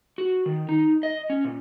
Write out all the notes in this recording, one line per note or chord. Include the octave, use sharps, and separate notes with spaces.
F#4
D#3
D#4
D#5
C#4
A#2